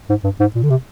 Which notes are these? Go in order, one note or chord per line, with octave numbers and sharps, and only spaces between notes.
G#2
G2
G#2
A#2
D3
C3